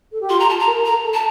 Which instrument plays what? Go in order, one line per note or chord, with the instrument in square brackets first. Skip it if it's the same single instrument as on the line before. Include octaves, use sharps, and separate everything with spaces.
[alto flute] A4
G4
[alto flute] F4 [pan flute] C6
[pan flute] A#5
A5
A#5
[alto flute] A#4
[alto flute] A4 [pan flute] A#5
[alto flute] A4
[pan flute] A5